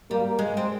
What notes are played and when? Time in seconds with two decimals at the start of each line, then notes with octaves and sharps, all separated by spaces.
0.11 G3 A#3
0.39 G#3
0.57 C4